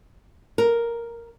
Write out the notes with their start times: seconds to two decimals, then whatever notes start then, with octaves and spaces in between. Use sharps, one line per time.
0.58 A#4